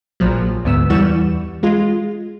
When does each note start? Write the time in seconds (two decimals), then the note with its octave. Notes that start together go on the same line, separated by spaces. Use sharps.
0.20 A#1 A#2 F3 F#3
0.65 D2 G#2 B3 E6
0.90 E2 E3 G3 F#5 C#6 E7
1.63 G#3 F4